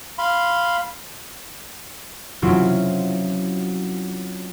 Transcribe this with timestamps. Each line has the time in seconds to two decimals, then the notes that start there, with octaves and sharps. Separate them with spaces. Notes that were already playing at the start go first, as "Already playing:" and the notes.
0.18 F5 B5 C6
2.42 F#3 C4 C#4 E4 F4